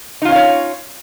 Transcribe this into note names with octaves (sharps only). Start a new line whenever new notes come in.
C#4 D#4 F4 C#5 F5